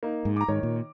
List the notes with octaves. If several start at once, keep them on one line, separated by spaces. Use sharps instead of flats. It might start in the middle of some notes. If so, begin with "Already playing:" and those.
A#3 D#4
G#2
A#5 D6
G#2 D#3 C#5
A#2